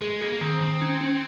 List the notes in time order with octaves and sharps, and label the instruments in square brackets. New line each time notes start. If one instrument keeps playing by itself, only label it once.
[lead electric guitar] G#3 [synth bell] G#4
[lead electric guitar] A#3 [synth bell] G#4
[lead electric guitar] A#3
[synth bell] D#3 [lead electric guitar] C4
[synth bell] D#3 [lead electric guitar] C4
[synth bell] C#4
C#4